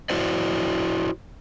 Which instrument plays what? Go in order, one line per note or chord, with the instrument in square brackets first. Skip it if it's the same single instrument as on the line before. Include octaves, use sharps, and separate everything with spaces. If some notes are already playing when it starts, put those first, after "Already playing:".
[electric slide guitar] E4 F#4 C5 D5